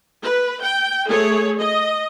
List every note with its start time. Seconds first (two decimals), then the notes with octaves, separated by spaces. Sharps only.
0.22 B4
0.61 G5
1.05 A3 G#4 C#5
1.58 D#5